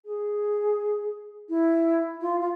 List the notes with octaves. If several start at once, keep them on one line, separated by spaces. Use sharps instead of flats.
G#4
E4
F4
F4